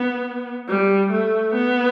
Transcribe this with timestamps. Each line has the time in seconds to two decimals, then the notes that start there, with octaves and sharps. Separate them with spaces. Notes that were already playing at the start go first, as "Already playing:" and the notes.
Already playing: B3
0.69 G3
1.11 A3
1.55 B3